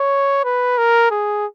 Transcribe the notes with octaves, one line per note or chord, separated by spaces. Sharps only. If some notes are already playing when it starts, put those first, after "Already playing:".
Already playing: C#5
B4
A#4
G#4